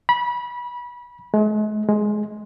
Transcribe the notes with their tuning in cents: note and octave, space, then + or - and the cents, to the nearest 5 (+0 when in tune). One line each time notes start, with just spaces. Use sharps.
B5 -25
G#3 +45
G#3 +20